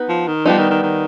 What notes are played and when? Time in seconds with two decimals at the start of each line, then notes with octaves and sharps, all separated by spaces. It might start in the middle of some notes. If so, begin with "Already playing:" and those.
Already playing: B3 D#4 B4
0.09 F3
0.27 D#3
0.45 F3 G3 B3 D#4
0.58 D#3
0.70 D#3
0.83 D#3